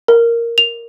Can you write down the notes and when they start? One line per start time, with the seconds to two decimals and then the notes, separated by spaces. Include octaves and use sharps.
0.08 A#4
0.58 F7